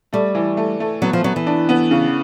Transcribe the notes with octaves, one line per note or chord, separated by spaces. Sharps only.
G3 A3
E3
A3
A3
F#3 B3
F3
F#3 B3
E3
D4
B3
C#3